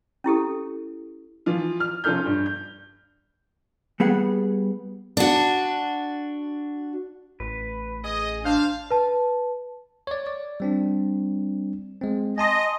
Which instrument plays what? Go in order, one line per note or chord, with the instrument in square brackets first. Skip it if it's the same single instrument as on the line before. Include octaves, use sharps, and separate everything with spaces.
[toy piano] C#4 E4 G4 A4
[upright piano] E3 F3 F4
F6
F1 C#4 F4 A4 F6 G6
G2
G6
[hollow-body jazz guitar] G3 B3 G#4 F#5
[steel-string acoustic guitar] D4 F#4
[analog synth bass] A1 [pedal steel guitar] B4
[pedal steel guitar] G#4 [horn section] D#5
[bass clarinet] D4 [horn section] C5 F5 [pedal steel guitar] G6
[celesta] B4 A5
[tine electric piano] C#5 D5
D5
G3 C4 D4
G#3 C4
[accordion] D#5 [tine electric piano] G#5 A5 C6